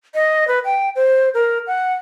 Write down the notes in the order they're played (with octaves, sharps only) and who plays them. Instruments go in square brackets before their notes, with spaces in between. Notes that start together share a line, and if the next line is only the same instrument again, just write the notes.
[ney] D#5
B4
G5
C5
A#4
F#5